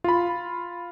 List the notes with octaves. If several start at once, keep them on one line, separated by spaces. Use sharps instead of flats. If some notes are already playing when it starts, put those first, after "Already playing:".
F4 B5